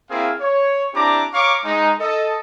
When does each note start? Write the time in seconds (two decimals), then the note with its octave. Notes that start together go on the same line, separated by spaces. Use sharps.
0.10 A#3 C4 E4 G#4 F5
0.41 C#5
0.94 C4 D4 E4 G4 A#5 D6
1.34 C#5 F5 A#5 C#6 D6
1.64 G#3 D#4
2.00 A4 D#5